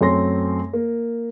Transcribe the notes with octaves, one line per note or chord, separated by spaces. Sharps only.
F#2 A3 C4 C#5 C6 A#6
A#3